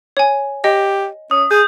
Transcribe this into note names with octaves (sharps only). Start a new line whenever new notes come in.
C#5 G#5
G4 D#5
C#4 D#6
G#4 G6